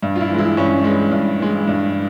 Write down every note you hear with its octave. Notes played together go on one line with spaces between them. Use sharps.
G2
F4
E4
E3
G#3 E4
G2 C#4
E3 G#3
G2
E3 G#3
G2